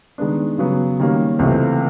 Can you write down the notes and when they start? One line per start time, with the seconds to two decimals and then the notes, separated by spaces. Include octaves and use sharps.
0.18 D#3 G#3 B3 D4
0.58 C#3 F#3 B3
0.99 D#3 G3 A#3 C#4
1.39 C#2 C3 E3 A3